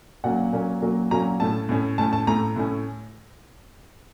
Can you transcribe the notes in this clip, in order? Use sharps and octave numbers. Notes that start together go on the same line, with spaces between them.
A#2 F#3 A#3 C#4 F#5
A#2 F#3 A#3 C#4
A#2 F#3 A#3 C#4
A#2 F#3 A#3 C#4 A#5
A2 A3 C#4 A5
A2 A3 C#4
A2 A3 C#4 A5
A5
A2 A3 C#4 A#5
A2 A3 C#4